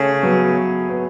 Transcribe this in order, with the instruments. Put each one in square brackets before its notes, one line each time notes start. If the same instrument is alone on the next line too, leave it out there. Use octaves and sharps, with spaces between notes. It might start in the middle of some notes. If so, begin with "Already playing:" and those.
Already playing: [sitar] C#3 [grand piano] A3 C#4
[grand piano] F#3 B3
B3